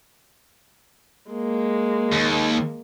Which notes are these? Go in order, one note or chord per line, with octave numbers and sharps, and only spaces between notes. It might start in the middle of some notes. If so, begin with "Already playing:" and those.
G#3 A#3
D#2